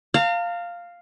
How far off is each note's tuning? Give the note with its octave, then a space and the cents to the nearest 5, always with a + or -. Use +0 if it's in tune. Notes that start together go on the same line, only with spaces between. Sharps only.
F5 +0 A#5 -45